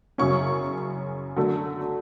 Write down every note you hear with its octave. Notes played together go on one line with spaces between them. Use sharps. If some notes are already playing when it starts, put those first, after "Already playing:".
F#2 C#3 F#3 C#4 C#6
D3 F#3 A3